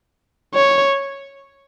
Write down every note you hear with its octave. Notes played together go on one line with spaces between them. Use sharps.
C#5